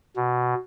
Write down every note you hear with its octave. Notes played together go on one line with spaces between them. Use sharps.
B2